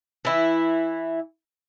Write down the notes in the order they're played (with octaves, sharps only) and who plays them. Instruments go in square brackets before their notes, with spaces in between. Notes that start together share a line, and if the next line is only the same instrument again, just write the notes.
[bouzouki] E3 E4